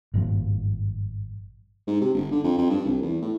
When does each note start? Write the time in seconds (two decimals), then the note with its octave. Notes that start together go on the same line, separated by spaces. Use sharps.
0.14 G#1 G2 A#2 F3
1.87 G#2
2.01 C3
2.14 G1
2.31 D3
2.44 F2
2.58 F2
2.70 G2
2.85 C2
3.02 E2
3.22 A2